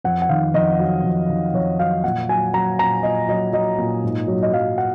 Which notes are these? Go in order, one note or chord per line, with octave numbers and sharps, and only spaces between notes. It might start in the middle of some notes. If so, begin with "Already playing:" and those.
F2 F#5
F#5
D#3 F5
F2 D#5
F#3
F2
D#3
F2 C#5
F#3 F5
A#2 F#5
F#3 G#5
F#3 A#5
A#2 A#5
A#2 D#5
F#3 D#5
F#3 D#5
A#2
G#2
F#3
D#5
F#3 F5
F#5